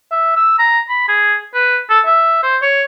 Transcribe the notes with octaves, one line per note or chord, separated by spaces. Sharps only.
E5
E6
A#5
B5
G#4
B4
A4
E5
C5
C#5